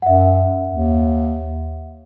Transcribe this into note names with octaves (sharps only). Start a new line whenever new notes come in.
F#2 E5 F#5
D#2